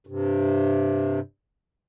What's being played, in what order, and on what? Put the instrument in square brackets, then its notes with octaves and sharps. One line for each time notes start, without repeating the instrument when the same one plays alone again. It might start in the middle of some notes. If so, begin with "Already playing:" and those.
[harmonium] G2 C3